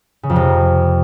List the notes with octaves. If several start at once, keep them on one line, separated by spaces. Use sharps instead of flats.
C#3
F2
C3